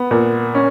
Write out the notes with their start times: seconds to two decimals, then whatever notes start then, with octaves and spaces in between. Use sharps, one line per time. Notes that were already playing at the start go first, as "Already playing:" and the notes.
Already playing: B3
0.11 A#2
0.55 C#4